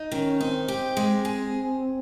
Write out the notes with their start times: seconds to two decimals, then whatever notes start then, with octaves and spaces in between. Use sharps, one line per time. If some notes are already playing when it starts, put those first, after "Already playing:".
Already playing: D#4
0.11 D#3 C#4
0.41 C4 D#4
0.68 G4
0.97 G#3
1.25 G#4